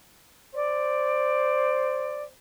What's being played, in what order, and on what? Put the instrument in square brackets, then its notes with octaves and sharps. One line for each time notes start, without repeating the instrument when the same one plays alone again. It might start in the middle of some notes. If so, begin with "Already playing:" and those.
[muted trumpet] C5 [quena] D5